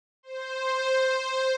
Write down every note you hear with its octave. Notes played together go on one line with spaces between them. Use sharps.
C5